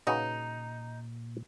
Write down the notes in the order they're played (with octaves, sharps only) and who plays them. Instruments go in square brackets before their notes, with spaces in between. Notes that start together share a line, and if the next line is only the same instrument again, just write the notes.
[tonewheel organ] A#2 [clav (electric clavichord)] C#3 F#4 B4 [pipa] D#4